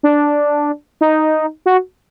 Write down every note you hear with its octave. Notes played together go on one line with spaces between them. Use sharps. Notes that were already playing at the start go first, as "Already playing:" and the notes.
D4
D#4
F#4